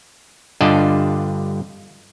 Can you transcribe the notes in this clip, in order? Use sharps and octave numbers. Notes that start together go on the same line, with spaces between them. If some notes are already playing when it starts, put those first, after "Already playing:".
G2 D3 F4 D5 D#5 A5